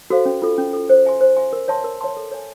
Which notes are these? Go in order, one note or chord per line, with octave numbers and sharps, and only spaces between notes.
F#4 A4 C5 F5
C#4
F4 A4
C#4
F4 A4
C5
E5 G#5 C6
C5
E5 G#5 C6
A#4
C#5 E5 A5 C6
A#4
C#5 E5 A5 C6
A4
C#5 E5 G#5